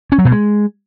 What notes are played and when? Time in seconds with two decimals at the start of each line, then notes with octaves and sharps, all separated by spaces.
0.12 C#4
0.18 F#3
0.25 B2
0.32 G#3